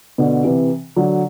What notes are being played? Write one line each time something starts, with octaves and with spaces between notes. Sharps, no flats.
B2 D3
C3 E3
D3 F#3